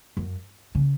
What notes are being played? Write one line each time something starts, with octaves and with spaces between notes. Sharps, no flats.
F#2
C#3